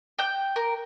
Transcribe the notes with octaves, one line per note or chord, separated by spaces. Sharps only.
G5 G6
A#4